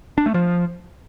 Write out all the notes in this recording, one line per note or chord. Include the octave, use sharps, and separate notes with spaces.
D4
A3
F3